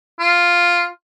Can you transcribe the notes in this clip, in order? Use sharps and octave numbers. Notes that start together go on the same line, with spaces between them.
F4